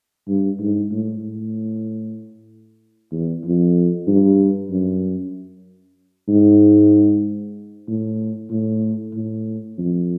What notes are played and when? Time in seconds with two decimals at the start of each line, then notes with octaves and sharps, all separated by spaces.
0.28 G2
0.59 G#2
0.91 A2
1.22 A2
3.12 E2
3.44 F2
4.07 G2
4.71 F#2
6.28 G#2
7.88 A2
8.50 A2
9.14 A2
9.78 F2